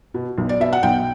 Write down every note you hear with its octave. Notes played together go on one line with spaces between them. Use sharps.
B2
B1
D5
B2 E5
F#5
B1 G5